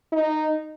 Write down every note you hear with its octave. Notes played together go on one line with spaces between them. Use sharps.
D#4